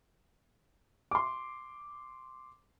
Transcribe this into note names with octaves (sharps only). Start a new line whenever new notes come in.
C6 D6